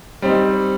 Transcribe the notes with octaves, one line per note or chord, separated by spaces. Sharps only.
G3 C4 D#4